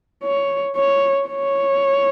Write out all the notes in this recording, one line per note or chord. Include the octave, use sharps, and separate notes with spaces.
C#5
C#5
C#5